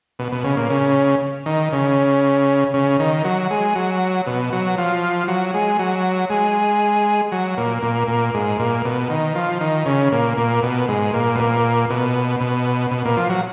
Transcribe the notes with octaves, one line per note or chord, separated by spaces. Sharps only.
B2
B2
C#3
A#2
C#3
D#3
C#3
C#3
D#3
F#3
G#3
F#3
B2
F#3
F3
F#3
G#3
F#3
G#3
F#3
A#2
A#2
A#2
G#2
A#2
B2
D#3
F3
D#3
C#3
A#2
A#2
B2
G#2
A#2
B2
A#2
B2
B2
B2
A#2
F3
F#3